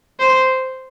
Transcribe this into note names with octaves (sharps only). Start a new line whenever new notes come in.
C5